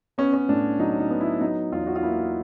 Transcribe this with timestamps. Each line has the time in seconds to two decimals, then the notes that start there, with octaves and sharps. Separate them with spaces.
0.18 B3 C#4
0.34 C#4
0.49 A2 D4
0.80 F#3 D#4
1.00 D#4
1.10 B3
1.21 E4
1.41 F#3 D#4
1.72 E2 F4
1.87 F#4
1.96 F4
2.03 A#3 E4